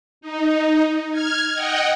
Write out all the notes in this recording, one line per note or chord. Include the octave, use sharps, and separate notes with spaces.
D#4
F6 G#6
D#5 F#5 G5